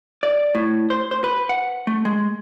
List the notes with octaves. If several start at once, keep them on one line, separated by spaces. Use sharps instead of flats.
D5
A2
C5
C5
B4
F#5
A3
G#3